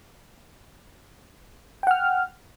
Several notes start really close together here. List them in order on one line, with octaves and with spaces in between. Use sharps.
G5 F#5 F6